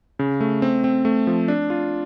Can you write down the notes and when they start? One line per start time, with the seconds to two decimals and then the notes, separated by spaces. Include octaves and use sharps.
0.19 C#3
0.41 A3
0.62 C4
0.84 C4
1.05 A3
1.27 F3
1.48 D4
1.70 F4